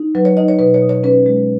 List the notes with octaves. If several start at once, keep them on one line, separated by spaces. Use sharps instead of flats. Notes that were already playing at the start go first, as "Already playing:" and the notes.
Already playing: D#4
F#3 B4
C#5
D#4 D#5
C#5
B2 B4
C#5
B2
C#5
C#4 B4
G#3